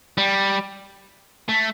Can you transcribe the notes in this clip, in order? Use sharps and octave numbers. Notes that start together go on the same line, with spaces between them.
G3
A3